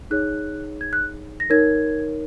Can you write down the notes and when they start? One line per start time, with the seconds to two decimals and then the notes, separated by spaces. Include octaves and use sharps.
0.11 D#4 G#4 C#5 F#6
0.81 G#6
0.93 F#6
1.40 A#6
1.50 D#4 A#4 C#5 G#6